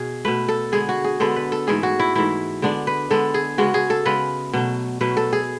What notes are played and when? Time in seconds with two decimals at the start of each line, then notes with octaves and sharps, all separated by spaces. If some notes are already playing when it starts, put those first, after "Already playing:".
Already playing: B2 G#4
0.25 B2 A3 B4
0.49 A4
0.72 D3 G#3 B3 G#4
0.89 F#4
1.04 G#4
1.20 D3 G#3 B3 A4
1.36 B4
1.52 A4
1.67 G#2 E3 A3 G#4
1.83 F#4
1.99 E4
2.15 G#2 E3 A3 E4
2.62 D3 G#3 B3 D4
2.87 B4
3.11 D3 G#3 B3 A4
3.34 G#4
3.58 C#3 G#3 B3 F#4
3.74 G#4
3.90 A4
4.05 C#3 G#3 B3 B4
4.53 B2 F#3 A3
5.01 B2 F#3 A3 B4
5.17 A4
5.33 G#4